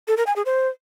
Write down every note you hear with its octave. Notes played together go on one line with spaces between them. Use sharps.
A4
A#4
G#5
G#4
C5